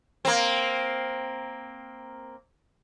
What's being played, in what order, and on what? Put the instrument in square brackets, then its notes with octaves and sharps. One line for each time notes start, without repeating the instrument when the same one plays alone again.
[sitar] A#3 C4